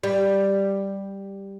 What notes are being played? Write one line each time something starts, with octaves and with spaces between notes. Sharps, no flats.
G3